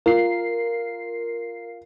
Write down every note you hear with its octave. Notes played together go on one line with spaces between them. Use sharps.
F4 A#4 C7